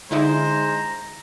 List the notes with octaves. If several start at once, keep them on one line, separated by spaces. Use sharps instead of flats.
D3 G#3 D#4 E4 C5 A#5